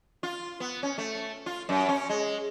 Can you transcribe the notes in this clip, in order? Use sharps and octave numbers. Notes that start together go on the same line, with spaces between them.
F4
B3
C#4
A3
F4
F#2
C#4
G#3